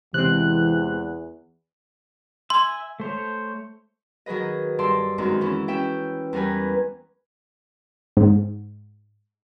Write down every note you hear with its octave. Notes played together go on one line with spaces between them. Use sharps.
E2 C3 E3 G#3 C4 F#6
E5 G#5 C6
A3 C5 C#5
D#3 F#3 G#4 B4 D#5
G2 D5 C6 E6
F#2 D#3 G#3 C4 D#4
E3 C#4 E4
C#4 E5 G5
E2 G3 A#4 B4 G#5
G#2